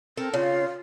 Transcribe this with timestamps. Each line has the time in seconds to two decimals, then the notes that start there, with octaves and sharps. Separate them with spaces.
0.17 C4 A4 A#4
0.34 C#3 F4